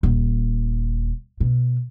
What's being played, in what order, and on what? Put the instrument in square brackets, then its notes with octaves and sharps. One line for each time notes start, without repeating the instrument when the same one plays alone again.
[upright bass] D#1
B2